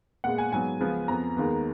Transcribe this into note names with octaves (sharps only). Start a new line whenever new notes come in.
A#2 G#3 B3 F#5
G#5
G#2 F#3 B3 G#5
C#2 C#3 F3 B3
F2 F3 B3 A#5
D#2 D#3 G#3 B3